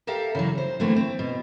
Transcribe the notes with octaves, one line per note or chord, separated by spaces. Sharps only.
G4 A4 A#4 E5 F5 G5
C#3 E3 F#3
C5
D3 E3 A3 A#3 C4
C4
B2